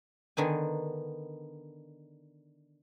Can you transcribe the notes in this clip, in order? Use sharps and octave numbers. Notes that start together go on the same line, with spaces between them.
D3 D#3 B3 G#5